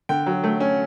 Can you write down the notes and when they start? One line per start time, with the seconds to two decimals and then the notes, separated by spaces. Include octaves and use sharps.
0.09 D3 G5
0.26 F#3
0.44 A3
0.60 C#4